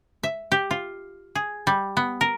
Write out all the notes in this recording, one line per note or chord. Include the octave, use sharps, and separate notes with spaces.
E5
G4
F4
G#4
G3
B3
A#4